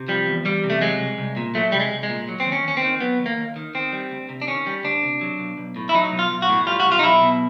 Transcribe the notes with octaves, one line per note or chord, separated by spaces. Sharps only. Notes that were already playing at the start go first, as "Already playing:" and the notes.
Already playing: C3
F3 G3
E2
E2 G3
C3
A3
F#3 G#3
C2
C2
A#2
F#3 A3
C2 G3
G#3
C2
G#3
A#2
F#3
C4
D#2
C#4
D#2 C#4
C4
D#3
F#3 B3
D#2
A#3
D#2
D#3
D#3 C4
G3
D2
C3
D4
D#3 C#4
G3
D2 D4
C3
F#3
B1
B1
A2
E4
F#3 D#4
B1
F4
B1
F#4
A2
G3 F4
F#4
B1
F4
D#4
B1 E4
B2